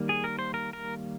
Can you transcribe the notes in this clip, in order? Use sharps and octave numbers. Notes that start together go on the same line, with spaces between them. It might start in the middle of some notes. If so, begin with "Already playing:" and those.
Already playing: D#3 G3 A#3
G#4
A#4
C5
A#4
A#4